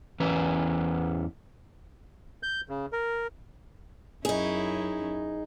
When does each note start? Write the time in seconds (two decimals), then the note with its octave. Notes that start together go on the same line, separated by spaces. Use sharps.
0.20 E2 E3 C#4 B4
2.43 G6
2.69 C#3
2.93 A#4
4.25 F#2 C#4 D#4 E4 G#4